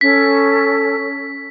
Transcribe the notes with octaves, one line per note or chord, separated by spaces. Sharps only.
C#4 A4 B6